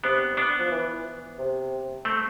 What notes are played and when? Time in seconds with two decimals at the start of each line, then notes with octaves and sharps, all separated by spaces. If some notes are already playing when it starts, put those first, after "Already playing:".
0.04 C3 B3 D4
0.37 B3 D4
0.59 F3
0.71 E3
1.39 C3
2.05 A3 C4